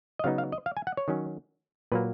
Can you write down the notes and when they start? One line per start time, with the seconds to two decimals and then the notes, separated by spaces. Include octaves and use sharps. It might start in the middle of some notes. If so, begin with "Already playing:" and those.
0.19 D#5
0.24 C#3 F#3 B3 D#4 F5
0.38 F5
0.52 D#5
0.66 F5
0.77 G#5
0.87 F#5
0.97 C#5
1.08 D#3 F#3 C#4
1.92 A#2 F#3 A#3 B4